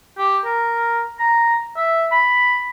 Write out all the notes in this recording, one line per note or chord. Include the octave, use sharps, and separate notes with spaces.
G4
A#4
A#5
E5
B5